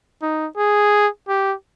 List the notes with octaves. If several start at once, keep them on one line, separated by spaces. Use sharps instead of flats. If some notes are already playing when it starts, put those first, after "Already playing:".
D#4
G#4
G4